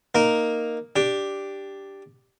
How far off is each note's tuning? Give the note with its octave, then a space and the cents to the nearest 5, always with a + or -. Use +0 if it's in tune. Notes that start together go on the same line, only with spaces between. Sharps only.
A#3 +0 D#4 +0 A#4 +0
D4 +0 G4 +0